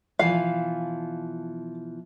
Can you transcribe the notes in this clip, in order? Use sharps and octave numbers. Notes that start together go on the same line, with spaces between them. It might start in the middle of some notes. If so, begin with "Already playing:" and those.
B2 E3 F3 F5